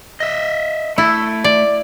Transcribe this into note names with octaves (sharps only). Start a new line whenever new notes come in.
D#5 E5
A3 E4
D5